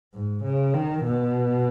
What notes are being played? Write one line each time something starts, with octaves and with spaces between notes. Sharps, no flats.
G#2
C#3
D#3
B2